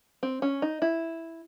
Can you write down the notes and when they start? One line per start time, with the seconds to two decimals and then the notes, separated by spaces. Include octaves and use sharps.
0.23 C4
0.42 C#4
0.62 D#4
0.82 E4